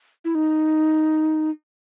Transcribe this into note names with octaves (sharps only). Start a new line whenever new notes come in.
E4
D#4